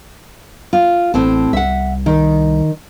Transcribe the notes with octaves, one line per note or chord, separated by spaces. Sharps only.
F4
A1 A2 C4 A5
C2 E5 F#5
D#3